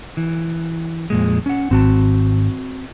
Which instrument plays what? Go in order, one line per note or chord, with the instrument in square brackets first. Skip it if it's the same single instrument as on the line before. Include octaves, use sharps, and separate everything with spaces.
[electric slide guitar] E3
F2 A#2 G#3
C#4 F#5
[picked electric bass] G#1 [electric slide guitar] C4 F#4 A5